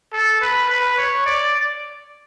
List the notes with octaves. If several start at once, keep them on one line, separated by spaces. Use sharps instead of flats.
A4
B4
B4
C#5
D5